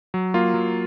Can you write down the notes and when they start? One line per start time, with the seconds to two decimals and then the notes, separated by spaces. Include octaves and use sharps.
0.14 F#3
0.34 A#3 F4
0.54 F#3